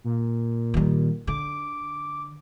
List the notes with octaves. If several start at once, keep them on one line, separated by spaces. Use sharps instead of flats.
A#2
D#3 G3
D3 D6